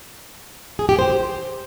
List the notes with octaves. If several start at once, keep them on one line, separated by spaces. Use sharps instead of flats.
G#4
G4
C5